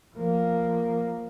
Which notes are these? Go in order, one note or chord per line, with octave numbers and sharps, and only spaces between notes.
F3 A#3